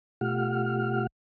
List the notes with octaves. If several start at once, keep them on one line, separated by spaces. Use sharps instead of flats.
B2 A3 F4 G4 F#5 F6